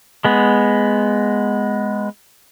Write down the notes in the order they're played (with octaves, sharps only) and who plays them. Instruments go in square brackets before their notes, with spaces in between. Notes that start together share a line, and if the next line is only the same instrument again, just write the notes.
[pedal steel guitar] G#3 B3